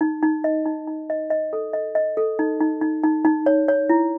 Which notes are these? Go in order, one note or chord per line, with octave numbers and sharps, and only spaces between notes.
D#4
D#4
D#5
D#4
D#4
D#5
D#5
A4
D#5
D#5
A4
D#4
D#4
D#4
D#4
D#4
C#5
C#5
E4